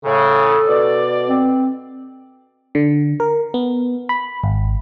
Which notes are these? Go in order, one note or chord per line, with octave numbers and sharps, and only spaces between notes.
A2 C#3 A4
B2 D5
C4
D3
A#4
B3
B5
G#1